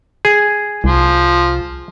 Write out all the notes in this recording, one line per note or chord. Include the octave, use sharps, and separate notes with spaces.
G#4
C2 F3